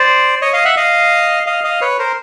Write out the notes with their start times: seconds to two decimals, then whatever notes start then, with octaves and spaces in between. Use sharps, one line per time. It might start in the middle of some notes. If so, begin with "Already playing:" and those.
Already playing: C5 D5
0.42 C#5 D#5
0.53 D#5 F5
0.65 E5 F#5
0.77 D#5 F5
1.46 D#5 F5
1.64 D#5 F5
1.81 B4 C#5
1.99 A#4 C5